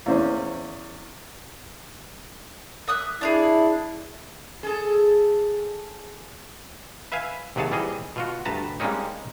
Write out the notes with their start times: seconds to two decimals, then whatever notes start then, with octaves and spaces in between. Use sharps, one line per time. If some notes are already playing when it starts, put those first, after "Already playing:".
0.06 E2 A#3 C#4 C5
2.88 E5 D#6 F#6
3.21 D4 E4 G4 G#4
4.63 G#4 A4
7.12 B4 E5 F5 G#5
7.56 D#2 C3 F#3 G#4 C#5 A5
7.71 E3 G3 G#4 D#5
8.16 B2 F4 F#4
8.45 D2 G2 B4 A5 A#5
8.80 G3 G#3 A#3 C4 C#4 D#4